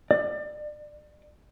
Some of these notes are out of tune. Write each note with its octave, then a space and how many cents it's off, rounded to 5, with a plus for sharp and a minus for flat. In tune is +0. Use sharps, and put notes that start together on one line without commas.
D5 +30